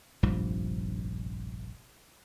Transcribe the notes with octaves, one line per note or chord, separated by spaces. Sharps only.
F1 A#1 G2 F3